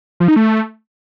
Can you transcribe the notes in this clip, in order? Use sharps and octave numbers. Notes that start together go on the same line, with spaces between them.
F3
D#4
A3